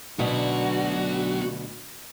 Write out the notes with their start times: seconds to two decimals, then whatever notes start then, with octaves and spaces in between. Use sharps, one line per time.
0.19 D2 B2 F#3 B3 D4 F#4